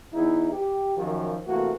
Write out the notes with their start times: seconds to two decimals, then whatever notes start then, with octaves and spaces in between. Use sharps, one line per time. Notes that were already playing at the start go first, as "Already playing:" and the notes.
0.14 E2 D#4 E4
0.52 G4
0.97 F#2 D#3 F3
1.47 C3 E3 A3 A#3 F#4